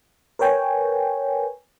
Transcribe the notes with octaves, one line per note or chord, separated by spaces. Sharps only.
A#4 B4 C#5 G5 G#5